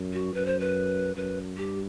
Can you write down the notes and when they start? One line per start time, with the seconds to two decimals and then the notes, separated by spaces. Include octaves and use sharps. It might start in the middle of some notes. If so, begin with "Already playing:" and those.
Already playing: F#2
0.13 F#4
0.34 F#2 B4
0.46 C5
0.60 B4
1.16 F#2 B4
1.57 G2 G4